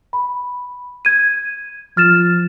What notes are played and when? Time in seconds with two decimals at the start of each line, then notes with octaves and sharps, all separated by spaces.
0.13 B5
1.05 G#6 D#7
1.97 F3 F6 A6 E7